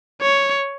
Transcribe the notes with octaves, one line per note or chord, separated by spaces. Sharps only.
C#5